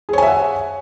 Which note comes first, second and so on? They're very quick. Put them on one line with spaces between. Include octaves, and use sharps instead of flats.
G#4 C#5 G#5 E5 F#5